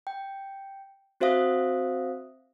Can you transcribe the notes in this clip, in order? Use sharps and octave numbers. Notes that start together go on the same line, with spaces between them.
G5
C4 F#4 C5 E5 F5 D#6